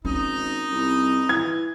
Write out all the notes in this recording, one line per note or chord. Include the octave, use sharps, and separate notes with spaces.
G#1 C#4 D#4
C2
E3 G#6